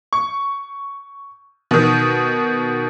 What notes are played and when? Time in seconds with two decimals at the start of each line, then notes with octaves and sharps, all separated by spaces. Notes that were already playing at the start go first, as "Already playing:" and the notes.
0.13 C#6
1.71 B2 D#3